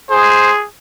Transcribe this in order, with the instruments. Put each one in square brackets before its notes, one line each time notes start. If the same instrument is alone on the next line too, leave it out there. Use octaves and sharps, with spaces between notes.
[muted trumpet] G#4 [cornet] C5